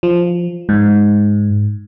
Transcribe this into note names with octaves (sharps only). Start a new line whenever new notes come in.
F3
G#2